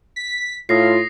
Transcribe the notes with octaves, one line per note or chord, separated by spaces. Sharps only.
B6
A2 F4 D#6 A#6 C7